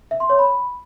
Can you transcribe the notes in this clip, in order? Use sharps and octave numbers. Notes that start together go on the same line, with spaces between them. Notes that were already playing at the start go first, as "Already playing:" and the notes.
E5
C6
C#5
B5